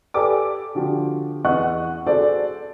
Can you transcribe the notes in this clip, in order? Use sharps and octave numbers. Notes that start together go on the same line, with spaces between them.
G4 A4 B4 D5 G#5 D6
D3 F3 F#4 G4
E2 B4 D#5 F#5 C#6 F#6
F#4 G#4 A4 C5 D5